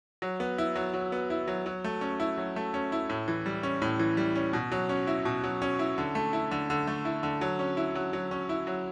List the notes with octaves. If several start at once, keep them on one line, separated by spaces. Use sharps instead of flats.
F#3
B3
E4
F#3
F#3
B3
E4
F#3
F#3
A3
C#4
E4
F#3
A3
C#4
E4
A2
E3
G3
C#4
A2
E3
G3
C#4
B2
F#3
C#4
E4
B2
F#3
C#4
E4
D3
A3
E4
D3
D3
A3
E4
D3
F#3
C#4
E4
F#3
F#3
C#4
E4
F#3